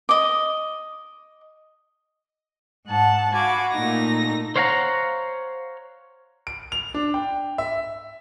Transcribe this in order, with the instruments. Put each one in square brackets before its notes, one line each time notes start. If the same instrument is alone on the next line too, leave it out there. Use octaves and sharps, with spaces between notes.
[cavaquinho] D#5 D6
[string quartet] G#2 F#5 A5
F#4 F5 G#5 B5 D6
A#2 A3 D#4 A#6
[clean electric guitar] C5 C#5 F5 F#5 G#5 A#5
[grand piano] D7
F7
D4
G5
E5